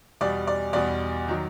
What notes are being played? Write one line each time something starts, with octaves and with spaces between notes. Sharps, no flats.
E2 B2 G3 D5
D5
E2 B2 G3 D5
D#3 F#3